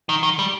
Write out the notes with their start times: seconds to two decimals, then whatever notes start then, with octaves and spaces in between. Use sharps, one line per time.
0.09 D#3
0.23 D#3
0.39 G3